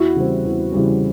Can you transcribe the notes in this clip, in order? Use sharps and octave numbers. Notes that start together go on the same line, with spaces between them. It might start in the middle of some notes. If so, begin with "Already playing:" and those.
Already playing: E2 E4 F#4
C#3 E3 G3 C4
E2
C#3 E3 G3 C4